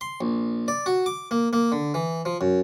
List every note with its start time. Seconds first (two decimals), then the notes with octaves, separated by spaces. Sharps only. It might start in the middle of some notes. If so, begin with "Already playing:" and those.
0.01 C6
0.21 A#1
0.68 D5
0.86 F#4
1.06 D6
1.31 A#3
1.53 A#3
1.72 D3
1.94 E3
2.25 F3
2.41 F#2